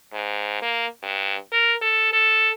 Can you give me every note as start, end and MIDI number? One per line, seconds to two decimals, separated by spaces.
0.13 0.60 44
0.62 0.87 58
1.03 1.36 43
1.52 1.75 70
1.81 2.11 69
2.13 2.50 69